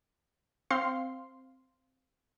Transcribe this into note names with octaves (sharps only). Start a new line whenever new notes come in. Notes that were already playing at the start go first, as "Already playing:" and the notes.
C4 F5 C6 C7